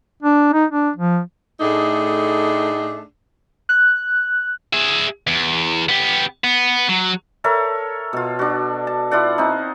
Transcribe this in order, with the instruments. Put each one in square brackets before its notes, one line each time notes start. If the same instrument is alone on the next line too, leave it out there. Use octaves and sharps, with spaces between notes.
[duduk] D4
D#4
D4
F3
[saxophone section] A2 A3 D4 D#4 G#4
[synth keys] F#6
[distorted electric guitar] G#4 E5
E2
B3 G4
B3
F#3
[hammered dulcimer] A4 A#4 C#5 E5
B2 F4
D4 F#4
A5
E4 F4 D5 F#5
C4 D#4